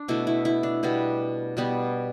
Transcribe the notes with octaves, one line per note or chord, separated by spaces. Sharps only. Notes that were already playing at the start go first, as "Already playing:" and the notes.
Already playing: D4
B2 A3 E4
E4
E4
D4
B2 G3 B3
B2 G3 B3